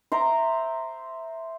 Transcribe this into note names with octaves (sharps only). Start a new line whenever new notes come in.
C5 E5 A#5 D6